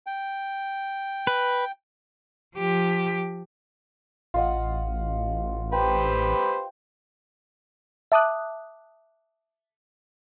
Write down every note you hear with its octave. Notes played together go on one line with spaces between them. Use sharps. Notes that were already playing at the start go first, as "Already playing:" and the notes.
G5
B4
F3 G4
A1 F4 D#5 F#5
G4 B4 C5 G5
E5 A5 D6 D#6 F#6